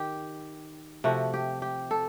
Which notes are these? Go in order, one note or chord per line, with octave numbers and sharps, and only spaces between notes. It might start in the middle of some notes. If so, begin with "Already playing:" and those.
Already playing: D#3 G4
C3 F3 A3 F#4
G4
G4
A4